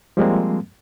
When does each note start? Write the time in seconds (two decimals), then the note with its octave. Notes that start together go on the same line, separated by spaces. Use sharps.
0.17 F3 G3 G#3 A#3 C4